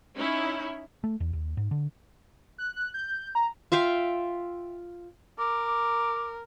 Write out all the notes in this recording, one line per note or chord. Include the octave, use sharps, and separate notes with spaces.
C#4 D#4 E4
A3
E2
D#2
G#2
D3
F#6
F#6
G6
A#5
F4 E5 F5 G5
A#4 D6